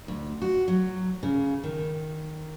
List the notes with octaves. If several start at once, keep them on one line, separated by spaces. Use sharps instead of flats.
D2
F#4
F#3
C#3
D#3